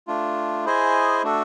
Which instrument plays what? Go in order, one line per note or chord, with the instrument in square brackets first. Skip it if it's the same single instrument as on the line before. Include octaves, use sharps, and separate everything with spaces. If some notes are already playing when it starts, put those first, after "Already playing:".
[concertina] A3 D4 F4
E4 G#4 C5 D#5 G#5
A3 D4 F#4 A4